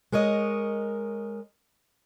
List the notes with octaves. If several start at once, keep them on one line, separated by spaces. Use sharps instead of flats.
G#3 A#4 C#5 D#5